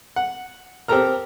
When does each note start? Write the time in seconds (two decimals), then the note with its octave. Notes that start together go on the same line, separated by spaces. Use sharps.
0.16 F#5
0.88 C4 G4 A4 A#4 A#5 F6